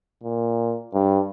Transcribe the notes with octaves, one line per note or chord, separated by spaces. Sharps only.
A#2
G2